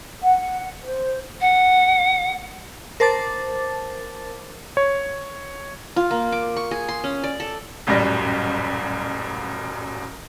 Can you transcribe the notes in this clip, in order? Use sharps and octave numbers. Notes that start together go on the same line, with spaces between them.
F#5
C5
F#5
A#4 C5 A5 D6 A6
C#5
F4
A#3
D6
C#6
G#4
C6
C#4
D5
A4
D#1 A1 F#2 G3 A#6